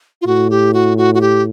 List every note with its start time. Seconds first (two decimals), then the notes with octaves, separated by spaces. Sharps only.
0.22 F4
0.27 A2 F#4
0.50 G4
0.74 F#4
0.98 F#4
1.14 F#4
1.21 G4